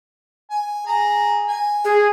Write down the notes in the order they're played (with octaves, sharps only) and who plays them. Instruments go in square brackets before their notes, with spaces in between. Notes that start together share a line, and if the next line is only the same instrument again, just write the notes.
[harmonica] G#5
G#4 A#5
G#5
[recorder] G#4